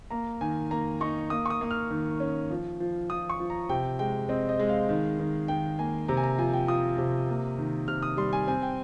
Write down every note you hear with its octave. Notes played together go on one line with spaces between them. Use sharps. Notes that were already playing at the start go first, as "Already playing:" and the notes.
A#3 A#5
D#3 G#5
A#3 A#5
D#4 C#6
A#3 D#6
C#6
D#6
A#3 D#6
F6
D#3
C#4
F3
F3
F3 D#6
C#6
F3
A#5
C3 G5
G#3 G5
C4 D#5
D#5
G#3
F5
D#3
D#3
D#3 G5
A#3 G#5
C3 A#5
G#5
A#5
F3 G#5
G5
F4 D#6
C3
A#3
D#3
C3 F6
D#6
G3 C6
G#5
C4 G#5
G5